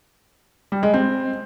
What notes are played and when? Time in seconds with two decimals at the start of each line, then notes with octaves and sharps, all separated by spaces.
0.72 G3
0.83 G#3
0.94 C4